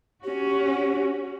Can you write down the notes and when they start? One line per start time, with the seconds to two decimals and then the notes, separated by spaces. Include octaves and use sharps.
0.24 C#4 F#4 G4